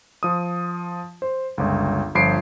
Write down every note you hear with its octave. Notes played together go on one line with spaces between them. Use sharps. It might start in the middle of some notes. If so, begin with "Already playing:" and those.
F3 D#6
C5
G1 C#2
G1 F3 B5 C7 D7